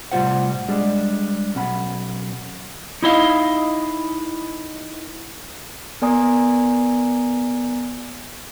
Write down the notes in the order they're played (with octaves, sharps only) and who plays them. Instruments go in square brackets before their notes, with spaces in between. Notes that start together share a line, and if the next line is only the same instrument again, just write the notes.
[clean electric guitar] A2 C3 G3 F4 C5 F#5
G3 G#3 D4 G4 G#4
B1 C#4 F#5 B5
D#4 E4 D#5 F5
[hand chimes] B3 A#4 D5 G#5 A#5 D#6